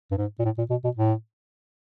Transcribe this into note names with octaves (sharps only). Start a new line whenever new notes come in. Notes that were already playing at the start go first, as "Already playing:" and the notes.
G2
G#2
A#2
A2
A#2
B2
B2
A2